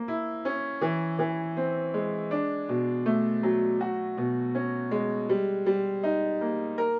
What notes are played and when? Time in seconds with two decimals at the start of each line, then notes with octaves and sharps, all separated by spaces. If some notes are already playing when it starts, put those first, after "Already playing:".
Already playing: A#3
0.08 E4
0.45 C#4
0.81 E3
1.19 E3
1.57 C4
1.94 G#3
2.31 D4
2.69 B2
3.06 A3
3.43 F#3
3.80 F#4
4.17 B2
4.55 C#4
4.91 G#3
5.29 G3
5.66 G3
6.03 D#4
6.41 A#3
6.78 A#4